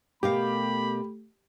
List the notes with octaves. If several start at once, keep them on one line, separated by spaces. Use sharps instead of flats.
B2 A3 G4 A#4 F5 B5